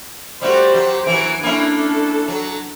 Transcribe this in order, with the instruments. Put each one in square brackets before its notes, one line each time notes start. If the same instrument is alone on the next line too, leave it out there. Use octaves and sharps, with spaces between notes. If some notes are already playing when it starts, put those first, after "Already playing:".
[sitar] G3 A3 F#4 [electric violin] G4 C5
[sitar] F#3
[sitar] E3 F#3 [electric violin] G#5 D7
[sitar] A#3 C#4 E4 [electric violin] D4 A4
[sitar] F#3